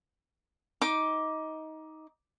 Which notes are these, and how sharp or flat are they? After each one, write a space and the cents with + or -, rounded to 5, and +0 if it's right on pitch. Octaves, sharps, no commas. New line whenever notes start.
D#4 +15 D6 +0